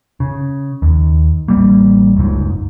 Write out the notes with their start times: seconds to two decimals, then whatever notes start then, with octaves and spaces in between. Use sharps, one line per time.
0.20 C#3
0.82 D#2
1.48 A1 G3 A#3
2.16 F#1 C#2 G#2